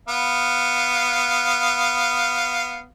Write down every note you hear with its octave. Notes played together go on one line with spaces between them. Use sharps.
B3 F5